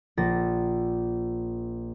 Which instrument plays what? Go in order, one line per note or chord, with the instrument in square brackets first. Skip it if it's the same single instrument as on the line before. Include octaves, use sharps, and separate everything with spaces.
[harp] A#1 A6 A#6